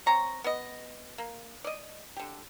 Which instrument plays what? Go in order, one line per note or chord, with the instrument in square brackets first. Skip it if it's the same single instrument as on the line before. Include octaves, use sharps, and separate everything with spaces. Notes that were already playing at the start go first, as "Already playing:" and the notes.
[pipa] C4 C#5 A#5 C#6
B3 D#5
A#3
D5 D#5
D3 G4